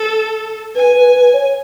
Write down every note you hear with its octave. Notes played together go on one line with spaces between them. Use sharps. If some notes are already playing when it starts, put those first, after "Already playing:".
Already playing: A4
B4 G#5
B4
B4
C#5